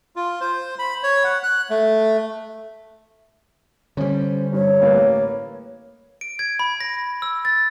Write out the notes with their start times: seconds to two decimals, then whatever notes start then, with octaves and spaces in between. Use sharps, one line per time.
0.16 F4
0.41 C5
0.79 B5
1.03 C#5
1.24 F#5
1.43 F#6
1.70 A3
3.97 D3 G3 C#4 C5
4.53 G2 C#5
4.81 A1 A#3 B4
6.21 D7
6.39 G#6
6.59 B5
6.81 A#6
7.22 E6
7.45 A6